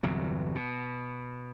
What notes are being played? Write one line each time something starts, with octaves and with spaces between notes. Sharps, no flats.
G1 E2 C3 F#3
B2